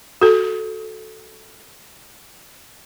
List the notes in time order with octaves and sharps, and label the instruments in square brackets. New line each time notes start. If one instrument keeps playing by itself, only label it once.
[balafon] F#4 A4